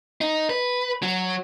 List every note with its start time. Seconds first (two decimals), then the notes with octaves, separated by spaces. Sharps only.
0.21 D#4
0.50 B4
1.03 F#3